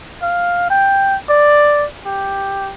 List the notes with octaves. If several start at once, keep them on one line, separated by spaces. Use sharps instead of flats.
F5
G5
D5
G4